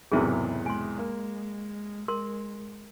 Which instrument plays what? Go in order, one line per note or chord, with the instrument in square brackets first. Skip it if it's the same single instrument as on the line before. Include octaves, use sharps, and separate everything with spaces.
[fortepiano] B1 E2 C3 [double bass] G#2 F#3 [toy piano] G#4 A#4 E5
[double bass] G#3 [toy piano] G#5 C6
[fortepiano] A#3
[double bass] G#3 [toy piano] A#4 C6